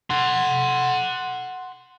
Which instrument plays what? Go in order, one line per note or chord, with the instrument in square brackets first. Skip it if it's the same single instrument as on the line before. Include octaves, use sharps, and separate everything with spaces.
[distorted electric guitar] F#5 C6